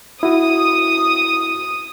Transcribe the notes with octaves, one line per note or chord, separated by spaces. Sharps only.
E4 F#4 D#6